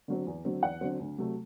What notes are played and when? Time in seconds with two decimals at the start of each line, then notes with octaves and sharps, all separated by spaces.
0.08 D3 F#3 C4
0.27 E2
0.45 D3 F#3 C4
0.63 E2 F#5
0.81 D3 F#3 C4
1.00 D2
1.18 C3 F#3 A3